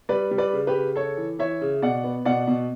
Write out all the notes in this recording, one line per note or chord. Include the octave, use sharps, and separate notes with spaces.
G3 B4 D5
G3
B4 D5
C#3
G4 B4
C#3
C#3 A4 C#5
E3
E3 C#5 E5
C#3
B2 D5 F#5
B3
B2 D5 F#5
B2